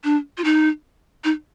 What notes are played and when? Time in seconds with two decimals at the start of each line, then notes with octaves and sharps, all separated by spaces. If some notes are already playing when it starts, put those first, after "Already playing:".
0.04 D4
0.38 F4
0.44 D#4
1.24 D#4